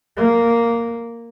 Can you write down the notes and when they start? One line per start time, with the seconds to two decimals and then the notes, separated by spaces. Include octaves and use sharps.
0.17 A#3